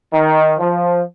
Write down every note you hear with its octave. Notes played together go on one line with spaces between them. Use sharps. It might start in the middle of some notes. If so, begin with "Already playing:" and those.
D#3
F3